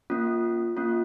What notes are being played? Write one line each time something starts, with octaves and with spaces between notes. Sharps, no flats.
A#3 C#4 F4
A#3 C#4 F4